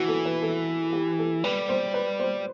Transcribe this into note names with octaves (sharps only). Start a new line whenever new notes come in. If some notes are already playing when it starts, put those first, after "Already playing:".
Already playing: E3 F#4
A4
B4
A4
G4
A4
G3 B4
C5
B4
C5